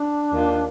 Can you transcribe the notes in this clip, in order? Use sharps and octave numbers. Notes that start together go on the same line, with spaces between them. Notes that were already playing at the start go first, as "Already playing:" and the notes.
Already playing: D4
D#2 D#3 A#3 F4